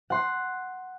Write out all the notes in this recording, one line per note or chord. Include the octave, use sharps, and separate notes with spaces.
F#5 C6